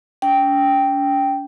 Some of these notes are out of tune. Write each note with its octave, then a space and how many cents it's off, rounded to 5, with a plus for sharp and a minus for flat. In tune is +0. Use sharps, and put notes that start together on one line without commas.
C#4 +45 G5 +0